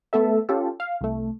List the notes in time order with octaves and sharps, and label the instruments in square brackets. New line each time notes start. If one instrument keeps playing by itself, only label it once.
[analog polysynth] A3 B3 A4 E5
C#4 F4 G4 A4
F5
C2 A3